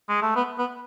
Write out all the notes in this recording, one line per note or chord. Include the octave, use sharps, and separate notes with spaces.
G#3
A3
B3
B3